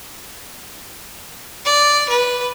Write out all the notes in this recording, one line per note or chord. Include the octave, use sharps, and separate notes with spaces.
D5
B4